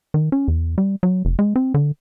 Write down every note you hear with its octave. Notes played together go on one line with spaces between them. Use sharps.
D#3
C#4
E2
G3
F#3
F1
G#3
C4
D3